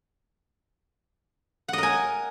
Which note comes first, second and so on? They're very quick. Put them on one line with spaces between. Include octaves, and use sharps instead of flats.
F#5 D#5 A#4 G#5